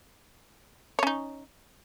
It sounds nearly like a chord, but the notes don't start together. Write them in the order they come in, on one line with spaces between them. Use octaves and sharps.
C#5 C#4 D#4